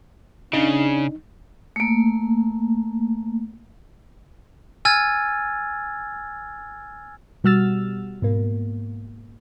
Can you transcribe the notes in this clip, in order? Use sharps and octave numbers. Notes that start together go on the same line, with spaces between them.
C#3 D4 D#4
A3 A#3
G#5 E6 F6 G#6 A6
B2 G3 F#4 E6 F6 A6
G#2 B2 A#3